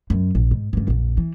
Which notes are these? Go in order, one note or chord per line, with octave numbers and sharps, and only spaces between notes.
F#2
A#1
G#2
G2 C#3
A#1 F2
E3